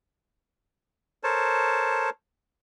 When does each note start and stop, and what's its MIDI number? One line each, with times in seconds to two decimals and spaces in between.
1.24 2.10 69
1.24 2.10 70
1.24 2.10 72
1.24 2.10 73
1.24 2.10 81